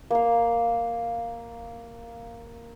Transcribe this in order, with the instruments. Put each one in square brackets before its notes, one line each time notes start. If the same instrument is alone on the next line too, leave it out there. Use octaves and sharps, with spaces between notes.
[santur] A#3 F5